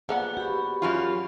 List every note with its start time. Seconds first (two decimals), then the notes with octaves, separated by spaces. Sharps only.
0.09 F3 A#3 B3 G#4 D5 F#5
0.37 F#4 G4 B5
0.82 F#2 C#4 F4